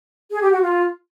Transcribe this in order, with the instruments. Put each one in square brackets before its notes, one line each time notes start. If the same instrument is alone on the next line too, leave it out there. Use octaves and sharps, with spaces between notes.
[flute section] G#4
G4
F#4
F4